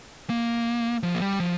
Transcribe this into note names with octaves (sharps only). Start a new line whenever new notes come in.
A#3
F3
A#3
G3
F3